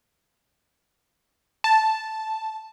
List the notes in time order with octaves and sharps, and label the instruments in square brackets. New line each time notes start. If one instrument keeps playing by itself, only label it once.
[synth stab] A5